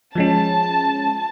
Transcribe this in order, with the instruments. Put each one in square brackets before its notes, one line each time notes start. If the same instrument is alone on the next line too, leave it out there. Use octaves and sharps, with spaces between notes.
[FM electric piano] F3 G#3 C#4 [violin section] A5